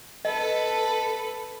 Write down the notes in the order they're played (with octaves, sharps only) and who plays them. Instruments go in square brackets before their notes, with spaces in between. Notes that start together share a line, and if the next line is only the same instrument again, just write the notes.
[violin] A4 B4 [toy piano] D#5